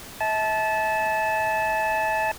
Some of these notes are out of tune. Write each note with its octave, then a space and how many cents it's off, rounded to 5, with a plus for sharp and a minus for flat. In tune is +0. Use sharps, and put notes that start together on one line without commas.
E5 -35 A5 -20